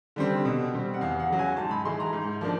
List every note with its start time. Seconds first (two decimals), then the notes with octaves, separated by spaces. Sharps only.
0.16 D3 G3 C4
0.45 B2
0.74 G3 C4
0.94 F#5
1.01 E2 F5
1.19 F#5
1.29 C#3 F#3
1.39 G#5
1.57 G#2 A5
1.71 B5
1.85 E3 G#3 C6
2.00 A#5
2.13 G#2
2.41 F3 A#3 D4